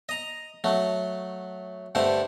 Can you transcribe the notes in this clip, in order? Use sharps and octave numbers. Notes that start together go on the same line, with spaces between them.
D#5 A#5
F#3 A3
G2 D3 A3 C5